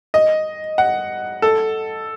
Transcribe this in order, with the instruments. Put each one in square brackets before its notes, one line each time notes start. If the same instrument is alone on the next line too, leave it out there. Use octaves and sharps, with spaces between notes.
[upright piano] D#5
F#5
A4